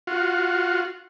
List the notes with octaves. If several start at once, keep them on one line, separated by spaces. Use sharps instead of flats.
F4 F#4